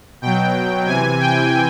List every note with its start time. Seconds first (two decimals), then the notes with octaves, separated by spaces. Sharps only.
0.22 B2 F#3 G5
0.86 C3 E3 G#5
1.20 G5